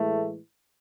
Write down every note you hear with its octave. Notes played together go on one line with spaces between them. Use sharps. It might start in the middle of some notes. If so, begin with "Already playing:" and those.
Already playing: A2 E3 G#3 A3